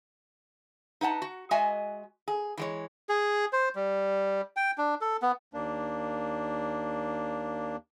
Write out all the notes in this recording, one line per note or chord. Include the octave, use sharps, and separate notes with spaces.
D#4 B4 F#5 A5
F#4
G#3 F#4 D#5 E5 G#5
G#4
E3 G#3 C#5
G#4
C5
G3
G5
D4
A4
B3
D#2 A#3 D4